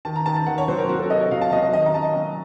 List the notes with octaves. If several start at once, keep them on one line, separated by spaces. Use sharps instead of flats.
D#3 A5
A#5
D#3 A5
A5
D#3 F#5
C#5
F#3 C5
A#4
F#3 F#4
A4
C3 D#5
C#5
F#3 F5
A5
F#3 D#5
D#5
D#3 D#5
A#5
C#4 A5
F#3